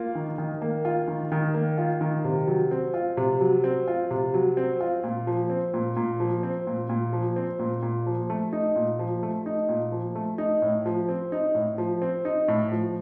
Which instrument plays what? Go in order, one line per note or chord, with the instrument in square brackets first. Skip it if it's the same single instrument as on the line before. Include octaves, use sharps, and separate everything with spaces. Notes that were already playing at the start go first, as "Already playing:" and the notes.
Already playing: [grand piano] A#3 F4
D#3
D#3
A#3
F4
D#3
D#3
A#3
F4
D#3
C3
F#3
C4
F4
C3
F#3
C4
F4
C3
F#3
C4
F4
A#2
F3
C4
A#2
A#2
F3
C4
A#2
A#2
F3
C4
A#2
A#2
F3
A3
D#4
A#2
F3
A3
D#4
A#2
F3
A3
D#4
A2
F3
C4
D#4
A2
F3
C4
D#4
A2
F3